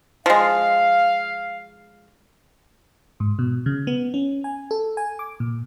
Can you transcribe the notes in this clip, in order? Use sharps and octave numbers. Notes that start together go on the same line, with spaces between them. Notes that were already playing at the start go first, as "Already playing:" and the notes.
F3 G#3 F5
G#2
B2
C#3
B3
C#4
G#5
A4
G#5
D6
A#2